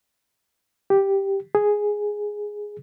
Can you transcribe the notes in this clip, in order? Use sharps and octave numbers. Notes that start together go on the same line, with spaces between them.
G4
G#4